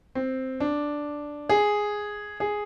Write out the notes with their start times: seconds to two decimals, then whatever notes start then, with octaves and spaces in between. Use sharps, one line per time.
0.15 C4
0.60 D4
1.49 G#4
2.40 G#4